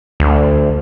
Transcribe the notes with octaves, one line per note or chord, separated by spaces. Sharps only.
D2